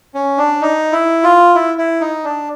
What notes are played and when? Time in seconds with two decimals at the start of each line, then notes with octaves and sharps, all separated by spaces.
0.15 C#4
0.38 D4
0.62 D#4
0.92 E4
1.23 F4
1.55 E4
1.78 E4
2.01 D#4
2.24 D4